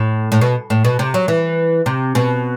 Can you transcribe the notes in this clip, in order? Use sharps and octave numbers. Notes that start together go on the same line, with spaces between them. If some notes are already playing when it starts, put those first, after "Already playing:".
Already playing: A2
A2
B2
A2
B2
C3
F#3
E3
C3
B2